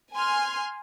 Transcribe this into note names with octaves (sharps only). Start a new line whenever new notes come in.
G#5 C6 F6